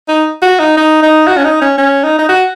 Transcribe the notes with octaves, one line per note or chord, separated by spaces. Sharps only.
D#4
F#4
D#4
D#4
D#4
F#4
C#4
D#4
C#4
C#4
D#4
D#4
F#4